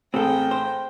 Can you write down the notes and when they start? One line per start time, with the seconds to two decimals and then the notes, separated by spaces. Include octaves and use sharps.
0.14 A1 C4 G#4 A4 G5 A#5
0.51 C5